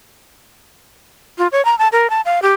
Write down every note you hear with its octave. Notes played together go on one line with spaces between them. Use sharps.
F4
C#5
A#5
A5
A#4
A5
F5
G4